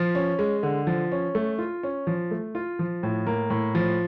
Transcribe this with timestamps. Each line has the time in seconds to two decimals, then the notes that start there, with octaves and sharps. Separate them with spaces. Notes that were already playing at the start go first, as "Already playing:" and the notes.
Already playing: F3
0.15 C#4
0.39 G#3
0.63 D3
0.87 F3
1.12 C#4
1.35 A3
1.58 F4
1.83 C#4
2.07 F3
2.31 A3
2.55 F4
2.79 F3
3.03 A2
3.27 A#3
3.50 A2
3.75 F3